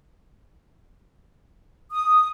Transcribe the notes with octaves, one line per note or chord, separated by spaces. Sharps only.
D#6